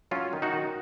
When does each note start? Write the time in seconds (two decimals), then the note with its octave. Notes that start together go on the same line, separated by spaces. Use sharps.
0.11 F#3 C#4 F4
0.33 D#3
0.42 D#4 F#4
0.53 D#3